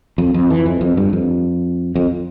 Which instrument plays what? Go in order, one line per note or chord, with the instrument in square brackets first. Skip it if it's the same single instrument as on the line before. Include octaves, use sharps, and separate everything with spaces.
[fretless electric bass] F2
F2
E3
F2
F2
G2
F2
F2